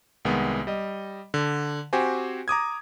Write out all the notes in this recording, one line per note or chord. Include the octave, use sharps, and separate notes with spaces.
C2 D#3 G#3 B3
G3 D#5
D3
C4 F#4 G4 C5 G#5
A#5 D6 D#6 G#6